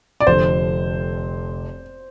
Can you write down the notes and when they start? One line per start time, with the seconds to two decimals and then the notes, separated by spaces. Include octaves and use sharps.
0.20 D5
0.27 F1 F2 D3 C5